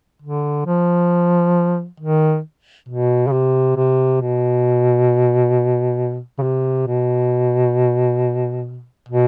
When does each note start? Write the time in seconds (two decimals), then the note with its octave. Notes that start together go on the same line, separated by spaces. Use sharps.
0.22 D3
0.66 F3
2.00 D#3
2.89 B2
3.27 C#3
3.32 C3
3.77 C3
4.21 B2
6.38 C#3
6.42 C3
6.87 B2
9.09 B2